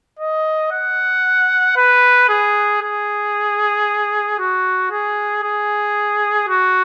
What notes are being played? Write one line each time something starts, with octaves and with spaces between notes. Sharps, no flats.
D#5
F#5
B4
G#4
G#4
F#4
G#4
G#4
F#4